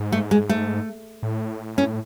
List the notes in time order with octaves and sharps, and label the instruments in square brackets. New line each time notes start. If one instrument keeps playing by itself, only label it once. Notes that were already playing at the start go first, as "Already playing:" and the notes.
Already playing: [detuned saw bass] G#2
[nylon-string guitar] A3
G#3
A3
[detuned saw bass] A2
[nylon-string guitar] C#4